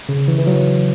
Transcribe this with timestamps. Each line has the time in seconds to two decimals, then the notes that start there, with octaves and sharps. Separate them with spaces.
0.09 C#3
0.28 E3
0.38 E3
0.47 F#3